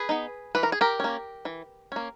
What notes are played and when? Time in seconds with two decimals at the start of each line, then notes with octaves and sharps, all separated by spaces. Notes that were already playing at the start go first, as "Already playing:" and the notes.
Already playing: G#4 B4
0.09 B3 D#4
0.55 E3 B4
0.63 A#4
0.72 G#4
0.81 G4 A#4
1.00 A#3 C#4
1.45 E3
1.92 A#3 C#4